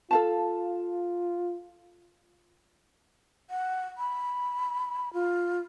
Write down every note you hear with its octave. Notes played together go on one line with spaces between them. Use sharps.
F4 A4 F5 A5
F#5
B5
F4